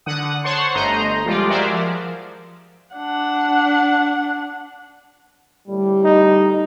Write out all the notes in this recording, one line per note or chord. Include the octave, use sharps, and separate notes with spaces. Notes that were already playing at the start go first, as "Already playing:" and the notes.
D3 F#5 D#6
C5 C#5 F#5 A5 C6 C#6
G1 A3 D#5 A#5 C6 G6
F3 G3 G#3 F4 D5
F#4 G#4 A#4 C5 D5 E5
F3
D4 F#5
A2 D3 G3
D#4